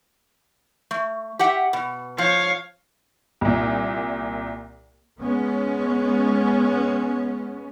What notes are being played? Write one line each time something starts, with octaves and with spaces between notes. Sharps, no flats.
A3
G4 E5 F#5
B2
F3 C#5 F5
C2 A#2
G#3 B3 C#4